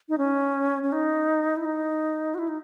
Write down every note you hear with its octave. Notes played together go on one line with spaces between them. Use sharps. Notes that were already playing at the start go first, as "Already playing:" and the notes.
D#4
C#4
C#4
D#4
E4
D#4
F#4
E4
D#4